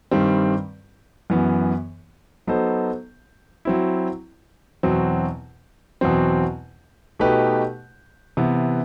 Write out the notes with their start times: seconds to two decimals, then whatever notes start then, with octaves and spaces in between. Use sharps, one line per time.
0.11 G2 D#3 G3 C4
1.30 F#2 E3 B3
2.47 F#3 B3 D#4 A4 C5
3.65 F#3 C4 E4
4.83 E2 B2 F#3 C4
6.01 E2 B2 F#3 C4
7.19 B2 A3 D#4 G4 B4
8.37 C3 E3 B3